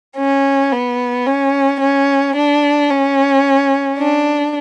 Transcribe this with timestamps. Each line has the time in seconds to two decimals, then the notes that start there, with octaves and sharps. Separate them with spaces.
0.17 C#4
0.72 B3
1.26 C#4
1.81 C#4
2.36 D4
2.90 C#4
3.99 D4